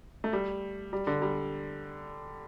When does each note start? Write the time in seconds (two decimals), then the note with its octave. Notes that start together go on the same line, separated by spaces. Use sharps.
0.24 A3
0.33 G3
0.93 G3
1.07 D3
1.22 G3